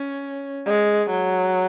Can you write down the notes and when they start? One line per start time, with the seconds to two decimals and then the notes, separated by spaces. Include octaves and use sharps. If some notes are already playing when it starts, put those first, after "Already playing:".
Already playing: C#4
0.66 G#3
1.11 F#3